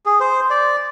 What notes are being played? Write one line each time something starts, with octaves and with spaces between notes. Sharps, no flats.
G#4
C5
D5